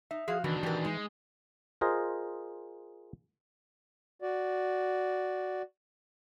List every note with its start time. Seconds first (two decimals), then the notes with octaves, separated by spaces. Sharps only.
0.11 D#4 E5
0.28 F3 F#4 G#4 F5
0.44 B2 D#3 E3 D4 F#4
0.63 E3 G4 A#4
0.84 G#3 D#4
1.81 F4 G#4 A#4 C5 D#5
4.22 F#4 D5